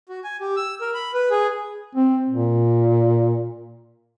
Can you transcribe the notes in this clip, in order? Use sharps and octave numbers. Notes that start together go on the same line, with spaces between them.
F#4
G#5
G4
E6
A#4
B5
B4
G#4
C4
A#2